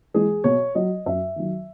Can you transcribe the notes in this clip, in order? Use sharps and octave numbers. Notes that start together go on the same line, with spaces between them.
E3 G#3 G#4
B2 C#5
F#3 D#5
F#2 E5
D#3 F#3